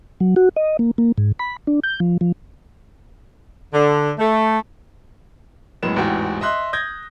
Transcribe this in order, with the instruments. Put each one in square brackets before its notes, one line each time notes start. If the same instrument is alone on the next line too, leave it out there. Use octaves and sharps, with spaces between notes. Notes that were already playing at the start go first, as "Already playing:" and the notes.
[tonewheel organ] F#3
F#4
D#5
A#3
A#3
G#2
B5
D4
G6
F3
F3
[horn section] D3
A3
[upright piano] F#2 A2 G#3 B3 E7
A1 E2 G#2 F#4 G5
D#5 E5 C6 F#6
D#6 G6 G#6 A#6